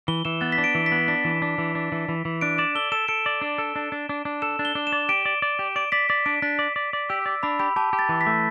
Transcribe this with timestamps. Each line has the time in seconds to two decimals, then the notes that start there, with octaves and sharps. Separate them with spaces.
0.08 E3 G7
0.25 E3 E7
0.41 B3 A6
0.52 B6
0.58 D4
0.64 D7
0.75 E3
0.86 B6
0.92 B3
1.08 D4 B6
1.25 E3
1.42 D4
1.58 E3
1.75 D4
1.92 E3
2.09 E3
2.25 E3
2.41 D4 D7
2.58 D5 E7
2.75 A4 G7
2.92 A4 E7
3.08 A4 D7
3.26 D5
3.42 D4
3.58 A4
3.76 D4
3.92 D4
4.09 D4
4.25 D4
4.42 A4 E7
4.59 D4
4.65 G7
4.75 D4
4.87 E7
4.92 D5
5.09 G4 D7
5.25 D5
5.42 D5
5.59 G4
5.76 D5 D7
5.92 D5 B6
6.09 D5 B6
6.26 D4 D7
6.42 D4 B6
6.59 D5
6.76 D5
6.93 D5
7.10 G4 E6
7.26 D5
7.43 D4 B5
7.60 G4 B5
7.76 G4 A5
7.93 G4
7.99 A6
8.09 E3
8.21 B6
8.27 A3